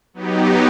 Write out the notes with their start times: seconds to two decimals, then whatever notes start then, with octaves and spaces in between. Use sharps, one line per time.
0.14 F#3 B3 D#4 G4